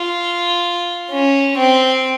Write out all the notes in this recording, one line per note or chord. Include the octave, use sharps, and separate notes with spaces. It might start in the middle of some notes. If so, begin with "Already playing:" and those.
Already playing: F4
C#4
C4